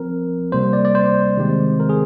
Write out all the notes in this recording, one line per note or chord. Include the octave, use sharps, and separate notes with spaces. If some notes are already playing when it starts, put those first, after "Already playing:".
Already playing: F3 C4 A#4
C3 G3 A#3 C5
D5
D5
C5
C3 D#3 G#3 C4
A#4
G#4